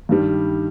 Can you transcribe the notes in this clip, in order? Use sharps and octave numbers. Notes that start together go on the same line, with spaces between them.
G2 D#3 G3